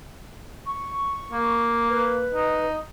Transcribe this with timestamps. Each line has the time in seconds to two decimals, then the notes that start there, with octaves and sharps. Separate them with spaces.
0.66 C#6
1.31 A#3
1.89 B4
2.34 D#4